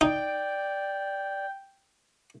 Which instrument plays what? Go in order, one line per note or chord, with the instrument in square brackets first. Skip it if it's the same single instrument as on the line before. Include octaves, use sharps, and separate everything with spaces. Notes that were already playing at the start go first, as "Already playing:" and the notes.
[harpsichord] D#4 [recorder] D5 [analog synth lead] G5